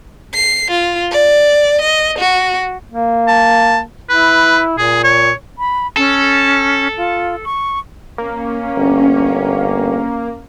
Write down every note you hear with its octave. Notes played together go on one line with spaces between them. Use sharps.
C7
F4
D5
D#5
F#4
A#3
A5
E4 B4
A#2 G#4
C#5
B5
C#4 A4
F4
C#6
A#3 C#4
G1